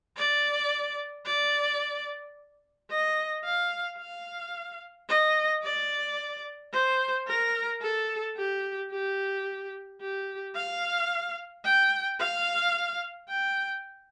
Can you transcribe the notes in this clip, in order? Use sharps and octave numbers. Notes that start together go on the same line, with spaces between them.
D5
D5
D#5
F5
F5
D#5
D5
C5
A#4
A4
G4
G4
G4
F5
G5
F5
G5